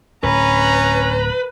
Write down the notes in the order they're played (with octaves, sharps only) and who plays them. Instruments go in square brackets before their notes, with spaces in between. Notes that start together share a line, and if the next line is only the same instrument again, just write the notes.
[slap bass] D1 [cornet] C#4 [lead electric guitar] B4 [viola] A#5